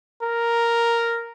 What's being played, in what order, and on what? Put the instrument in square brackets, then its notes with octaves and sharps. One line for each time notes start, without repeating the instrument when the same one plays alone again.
[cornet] A#4